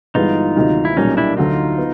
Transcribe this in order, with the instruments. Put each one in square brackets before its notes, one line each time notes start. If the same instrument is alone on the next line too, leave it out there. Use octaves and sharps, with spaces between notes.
[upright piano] G1 G2 E3 G#3 B3 [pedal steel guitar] D#4 F4
[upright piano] D2 C3 D#3 F#3 A#3
[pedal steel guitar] E4
[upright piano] B1 A#2 G3 A#3 [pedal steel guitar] C#4 D#4
[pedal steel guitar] D4 E4
[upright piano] D2 D3 F#3 [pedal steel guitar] D#4 F4
[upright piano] B3